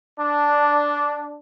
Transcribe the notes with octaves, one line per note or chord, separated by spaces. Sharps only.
D4